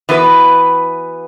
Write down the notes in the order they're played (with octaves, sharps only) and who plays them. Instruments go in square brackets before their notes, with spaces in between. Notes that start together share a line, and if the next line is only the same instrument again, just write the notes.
[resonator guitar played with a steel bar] E3 B3 F#4 B4